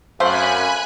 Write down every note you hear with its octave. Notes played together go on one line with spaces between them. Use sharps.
F#2 A3 C4 C5 F5 G#5 B5 F#6